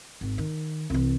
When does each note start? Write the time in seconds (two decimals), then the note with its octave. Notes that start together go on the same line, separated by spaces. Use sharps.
0.21 G#1
0.38 D#3
0.90 C2 E3